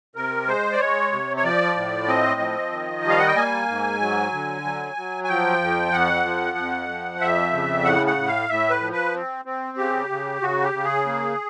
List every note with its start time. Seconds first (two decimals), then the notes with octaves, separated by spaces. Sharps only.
0.16 C3 A#4
0.48 G#3 C5
0.73 D5
0.80 G#3 C#5
1.12 C3
1.37 C#5
1.44 F3 D5
1.76 A2
2.08 C4 D#5
2.40 F3
2.72 D#3
3.05 G3 F5
3.18 F#5
3.27 G5
3.36 A#3 G#5
3.68 G#2
4.00 F#3
4.32 D3
4.64 F#3
4.97 F#3
5.24 G#5
5.29 F3 G5
5.61 F2
5.93 F2 F#5
6.25 F3
6.57 F2
6.89 F3
7.21 F2 E5
7.53 C#3
7.85 A2 F#5
8.07 F#5
8.17 A2
8.28 F5
8.49 A2 E5
8.70 B4
8.81 F3
8.92 B4
9.14 C4
9.45 C4
9.77 C#3 G4
10.10 C#3
10.41 C#3 F#4
10.63 G4
10.74 C#3
10.84 G#4
11.06 A#3